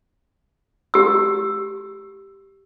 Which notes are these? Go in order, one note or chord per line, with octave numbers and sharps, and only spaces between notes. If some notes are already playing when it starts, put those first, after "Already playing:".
G4 E6